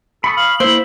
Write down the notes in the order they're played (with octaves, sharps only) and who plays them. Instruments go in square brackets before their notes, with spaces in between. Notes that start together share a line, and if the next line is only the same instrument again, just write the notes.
[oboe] A4 [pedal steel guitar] B5 C#6 D#6
[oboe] F5 [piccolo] F#7
[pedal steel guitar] A#3 E4 [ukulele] C5 [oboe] E5